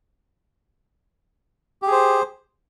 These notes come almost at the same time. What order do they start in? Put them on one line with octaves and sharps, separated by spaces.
G4 G#4 C5